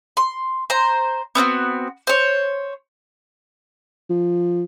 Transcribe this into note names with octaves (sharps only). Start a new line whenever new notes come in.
C6
C5 A#5
B3 C4 D4 F#4
C5 C#5
F3